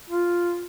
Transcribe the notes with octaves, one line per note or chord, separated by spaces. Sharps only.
F4